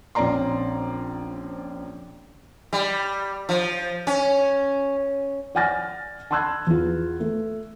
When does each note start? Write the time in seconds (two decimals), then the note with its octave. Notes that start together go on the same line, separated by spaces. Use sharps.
0.15 A#1 C4 C#4 D5 A#5 C6
2.73 G3
3.49 F3
4.07 C#4
5.55 D5 F#5 G#5 F6 A6 A#6
6.31 A5 B5 C6 E6 F#6 G#6
6.67 E2 F4
7.20 A3